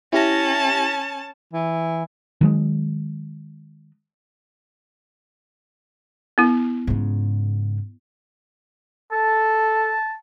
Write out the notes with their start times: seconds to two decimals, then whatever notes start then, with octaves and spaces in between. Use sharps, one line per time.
0.13 C#4 E4 G4 A5 A#6
1.53 E3
2.41 D#3 F#3 G#3
6.38 B3 E4
6.87 G#2 C#3
9.12 A4 A5